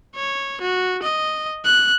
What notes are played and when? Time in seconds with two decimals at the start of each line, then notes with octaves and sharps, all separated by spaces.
0.15 C#5
0.61 F#4
1.03 D#5
1.65 F#6